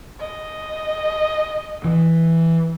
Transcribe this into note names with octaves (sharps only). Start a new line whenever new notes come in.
D#5
E3